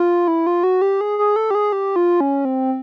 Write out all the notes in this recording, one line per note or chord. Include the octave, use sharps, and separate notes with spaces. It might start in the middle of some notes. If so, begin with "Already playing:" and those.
Already playing: F4
E4
F4
F#4
G4
G#4
G#4
A4
G4
G#4
G4
F4
C#4
C4